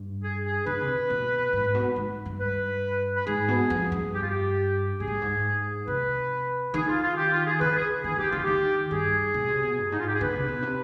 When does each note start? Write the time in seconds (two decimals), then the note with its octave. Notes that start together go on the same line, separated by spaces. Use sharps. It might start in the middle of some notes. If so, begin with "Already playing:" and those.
Already playing: G2
0.23 G#4
0.45 G#4
0.66 D3 B4
0.81 C3
1.10 B2
1.53 G#2
1.75 B2
1.96 G#2
2.26 G2
2.40 B4
3.16 B4
3.27 G#2 G#4
3.48 B2
3.70 F2
3.92 G2
4.14 G4
4.22 F4
4.29 G4
5.00 B2 G#4
5.07 G#2
5.14 G2
5.22 G#2
5.87 C3 B4
6.74 D#3 G#4
6.88 F4
7.02 F4
7.17 G4
7.32 F4
7.46 G#4
7.61 D3 B4
7.76 G#4
8.04 D#3 G#4
8.18 D#3 G4
8.31 D3 F4
8.44 D#3 G4
8.91 G2 G#4
9.34 B2
9.48 C3
9.63 B2
9.78 G2
9.92 G#2 D#4
10.00 F4
10.07 G4
10.14 G#4
10.21 D3 B4
10.35 C3
10.48 B2
10.62 C3